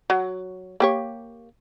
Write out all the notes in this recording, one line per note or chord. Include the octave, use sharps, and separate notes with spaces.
F#3
A#3 G4 C#5